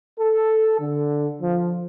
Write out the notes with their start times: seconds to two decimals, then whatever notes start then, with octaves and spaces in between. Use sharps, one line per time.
0.20 A4
0.81 D3
1.42 F3